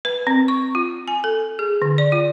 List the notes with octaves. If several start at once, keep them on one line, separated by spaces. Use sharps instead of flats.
B4
C4
C#6
F4
G#5
A4
G#4
D3
D5
F4